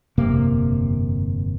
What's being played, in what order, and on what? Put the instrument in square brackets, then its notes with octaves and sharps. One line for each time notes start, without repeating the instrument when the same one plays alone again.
[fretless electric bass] G1 F2 C3 A#3